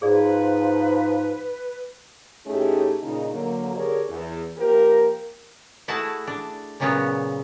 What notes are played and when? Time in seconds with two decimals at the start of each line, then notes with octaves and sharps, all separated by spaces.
0.02 G#2 F3 G#4 B4 D5
2.46 A2 A3 C#4 D#4 G4 G#4
3.02 A#2 C#3 D#4
3.33 D3 F#3 A#3
3.76 D3 G4 G#4 A#4 C#5 D5
4.10 E2
4.57 F3 A#3 G4 A#4
5.88 A3 E4 F#4 G#4 A5
6.27 D4
6.80 A#2 C#3 F#3 B3 C#4 C#5